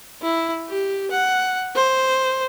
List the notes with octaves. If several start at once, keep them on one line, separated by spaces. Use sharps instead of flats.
E4
G4
F#5
C5